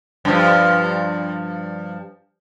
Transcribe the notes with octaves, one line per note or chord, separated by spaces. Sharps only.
G2 F3